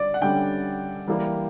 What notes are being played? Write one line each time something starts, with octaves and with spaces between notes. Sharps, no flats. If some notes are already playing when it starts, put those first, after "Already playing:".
Already playing: D3 G3 D5
F#5
D3 G3 C#4 G5
E3 G3 A#3